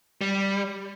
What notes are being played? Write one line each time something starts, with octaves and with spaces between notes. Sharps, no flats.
G3